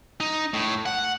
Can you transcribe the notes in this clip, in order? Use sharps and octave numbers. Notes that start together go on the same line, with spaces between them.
D#4
A2
F#5